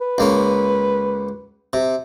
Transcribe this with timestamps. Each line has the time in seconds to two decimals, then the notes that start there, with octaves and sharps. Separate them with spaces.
0.01 B4
0.18 C#2 A#3 C#4
1.73 C3